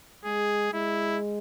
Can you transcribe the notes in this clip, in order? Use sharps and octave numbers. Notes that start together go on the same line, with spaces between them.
G#3 G#4
G#3 E4